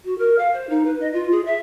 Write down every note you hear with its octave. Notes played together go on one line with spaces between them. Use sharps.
F#4
A#4
F5
C5
D#4
B4
D#5
F4
G#4
E5